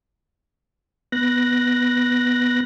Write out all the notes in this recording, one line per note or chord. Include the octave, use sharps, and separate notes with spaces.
B3 F#6 A#6